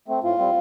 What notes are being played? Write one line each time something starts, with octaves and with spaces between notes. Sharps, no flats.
A3 C4
A2 F4
G3 C4